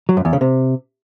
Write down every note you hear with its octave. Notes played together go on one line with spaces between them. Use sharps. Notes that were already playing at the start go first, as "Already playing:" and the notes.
F#3
F#2
E2
C#3
C3